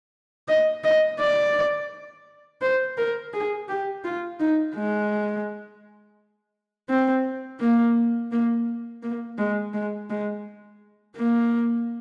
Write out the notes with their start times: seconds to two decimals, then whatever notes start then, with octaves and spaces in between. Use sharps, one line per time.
0.48 D#5
0.84 D#5
1.19 D5
2.61 C5
2.97 A#4
3.33 G#4
3.68 G4
4.04 F4
4.40 D#4
4.75 G#3
6.89 C4
7.60 A#3
8.32 A#3
9.03 A#3
9.38 G#3
9.74 G#3
10.09 G#3
11.16 A#3